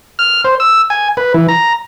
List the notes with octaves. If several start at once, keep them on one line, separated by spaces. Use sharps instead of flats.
F6
C5
E6
G#5
B4
E3
A#5